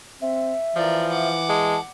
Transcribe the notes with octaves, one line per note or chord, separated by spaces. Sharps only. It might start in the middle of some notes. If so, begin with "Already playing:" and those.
C4 E5
E3 F3 A#4 D5
F#5 D6
G#3 A5